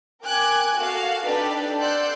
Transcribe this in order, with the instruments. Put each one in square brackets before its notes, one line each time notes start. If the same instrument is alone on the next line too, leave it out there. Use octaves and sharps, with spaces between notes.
[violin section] A#4 G5 G#5 D6 F#6 G#6
F#4 A4 F5
D4 D#4 G4 A4 B4 D5
D5 F#5 C6 E6 F#6 G6